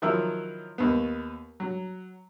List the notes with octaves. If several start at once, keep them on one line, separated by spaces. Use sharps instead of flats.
D#3 F3 F#3 E4 E6
D#2 B3
F#3